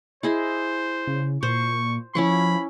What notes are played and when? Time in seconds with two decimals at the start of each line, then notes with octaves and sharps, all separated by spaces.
0.23 E4 G#4 C5 D#5
1.07 C#3
1.43 A#2 C5 C#6
2.15 F3 C#4 E4 B5 C#6